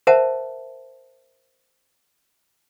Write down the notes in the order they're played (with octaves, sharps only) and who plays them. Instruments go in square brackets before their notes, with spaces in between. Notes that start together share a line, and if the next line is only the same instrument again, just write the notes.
[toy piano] A#4 C5 E5 F#5 A5